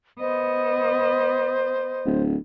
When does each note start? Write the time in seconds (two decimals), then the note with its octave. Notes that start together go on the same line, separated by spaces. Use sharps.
0.20 B3 C5 D#5
2.05 D1